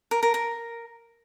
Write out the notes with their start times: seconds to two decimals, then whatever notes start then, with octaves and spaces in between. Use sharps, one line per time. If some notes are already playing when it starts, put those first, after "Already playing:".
0.11 A#4
0.23 A#4
0.34 A#4